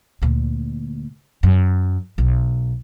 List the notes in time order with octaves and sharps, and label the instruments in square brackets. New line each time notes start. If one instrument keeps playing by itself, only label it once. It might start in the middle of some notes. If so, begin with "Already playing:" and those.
[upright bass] D2 A#2
F#2
B1